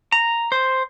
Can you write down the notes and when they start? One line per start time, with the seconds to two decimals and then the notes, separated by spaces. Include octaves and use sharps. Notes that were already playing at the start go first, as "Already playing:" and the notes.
0.12 A#5
0.52 C5